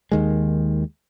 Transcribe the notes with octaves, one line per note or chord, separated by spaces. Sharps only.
D#2 D#3 G#3